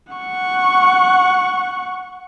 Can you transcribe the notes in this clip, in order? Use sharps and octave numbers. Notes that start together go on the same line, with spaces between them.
F#5 C#6